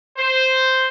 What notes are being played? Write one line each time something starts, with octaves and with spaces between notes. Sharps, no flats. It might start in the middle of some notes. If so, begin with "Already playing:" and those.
C5